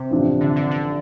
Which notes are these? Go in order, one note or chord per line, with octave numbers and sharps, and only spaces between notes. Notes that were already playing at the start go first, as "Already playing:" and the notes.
Already playing: C3
A1 G2 F3 D4 G4
D3
D3
D3